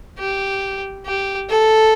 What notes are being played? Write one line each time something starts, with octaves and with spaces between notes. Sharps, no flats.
G4
G4
A4